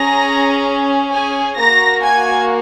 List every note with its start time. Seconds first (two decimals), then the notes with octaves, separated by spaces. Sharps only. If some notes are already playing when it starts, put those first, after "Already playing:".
Already playing: C#4 G#4 A#5 A#6
1.11 G#4 G#5
1.57 A#3 F#4 A#5 A#6
2.03 G#5 G#6